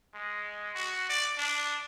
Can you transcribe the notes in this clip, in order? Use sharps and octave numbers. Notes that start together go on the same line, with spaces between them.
G#3
F#4
D5
D4